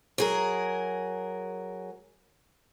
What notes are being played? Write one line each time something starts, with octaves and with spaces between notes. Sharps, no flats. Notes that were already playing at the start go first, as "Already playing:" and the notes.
F#3 G#4 A#4